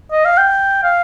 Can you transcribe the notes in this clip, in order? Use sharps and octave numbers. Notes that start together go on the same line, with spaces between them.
D#5
F5
G5
F5